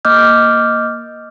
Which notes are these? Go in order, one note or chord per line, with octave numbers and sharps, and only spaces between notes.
A#3 D#5 D6 F6 G6